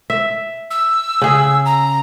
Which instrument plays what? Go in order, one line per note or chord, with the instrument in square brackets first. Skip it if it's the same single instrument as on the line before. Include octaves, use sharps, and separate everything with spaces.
[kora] E5
[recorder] E6
[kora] C#3 G#4
[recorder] A#5